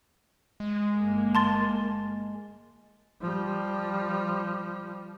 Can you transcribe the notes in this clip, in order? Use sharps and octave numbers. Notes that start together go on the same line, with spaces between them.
G#3
G1 A#3
A5 C6 A6
F3 G3